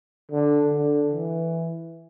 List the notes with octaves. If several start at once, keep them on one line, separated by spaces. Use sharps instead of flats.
D3
D3
E3